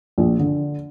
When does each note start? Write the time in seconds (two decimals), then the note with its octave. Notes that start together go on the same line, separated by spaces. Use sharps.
0.18 A#1
0.39 D3